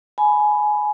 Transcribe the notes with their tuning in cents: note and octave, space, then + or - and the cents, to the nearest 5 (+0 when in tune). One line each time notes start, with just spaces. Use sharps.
G#5 +15 B5 +0